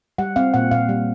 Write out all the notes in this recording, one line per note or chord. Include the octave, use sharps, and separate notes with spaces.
G3 F#5
C4 F5
A#2 F#5
A#2 F5
G3